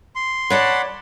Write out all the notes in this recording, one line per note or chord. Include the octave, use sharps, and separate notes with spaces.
C6
C#5 D5 F#5 A5 B5